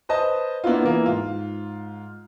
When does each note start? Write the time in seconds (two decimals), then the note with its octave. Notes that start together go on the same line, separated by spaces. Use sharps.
0.09 B4 C5 D#5 A5
0.64 A#3 B3 D4 E4 F4
0.84 E3 A#3
1.06 G#2 F4